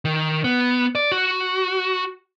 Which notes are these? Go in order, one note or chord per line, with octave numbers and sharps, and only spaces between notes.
D#3
B3
D5
F#4